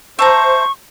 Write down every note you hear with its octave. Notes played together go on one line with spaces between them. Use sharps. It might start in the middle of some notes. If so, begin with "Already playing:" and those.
C5 E5 A5 A#5 C#6